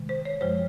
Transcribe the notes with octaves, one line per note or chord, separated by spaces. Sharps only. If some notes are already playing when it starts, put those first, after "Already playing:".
Already playing: C3 D#3 G#3
C5
C#5
F#2 F3 G#3 C5